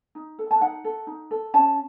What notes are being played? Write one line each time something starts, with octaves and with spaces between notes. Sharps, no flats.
D#4
A4
A5
D#4 F#5
A4
D#4
A4
C#4 A5